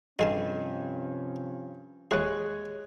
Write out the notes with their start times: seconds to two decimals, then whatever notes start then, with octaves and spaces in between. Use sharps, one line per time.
0.19 B1 G2 C3 F3 C#4 G#4 D#5 A5
2.11 D#2 G#3 G#4 C#5 F#6